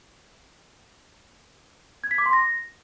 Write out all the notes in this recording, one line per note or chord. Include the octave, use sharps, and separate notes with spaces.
G#6
B6
D6
C6
A#6